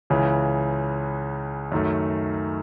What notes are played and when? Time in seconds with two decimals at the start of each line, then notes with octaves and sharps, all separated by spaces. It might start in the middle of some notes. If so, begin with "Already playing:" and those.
0.10 C#2 C#3 E3
1.72 F#2 D#3 A3